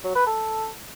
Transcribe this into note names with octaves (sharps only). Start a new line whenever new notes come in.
F#3
B4
A4